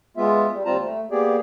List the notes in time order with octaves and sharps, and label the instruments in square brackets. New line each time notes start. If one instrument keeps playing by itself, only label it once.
[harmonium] G#3 B3 F4 E5
G3
D#2 G3 C4 F4 A5 A#5
A3
A#3 B3 G4 G#4 D5